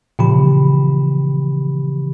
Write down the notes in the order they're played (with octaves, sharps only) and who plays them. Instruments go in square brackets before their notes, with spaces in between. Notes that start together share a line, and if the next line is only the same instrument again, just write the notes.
[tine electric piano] A#2 C#3 E3 F3 G4 B5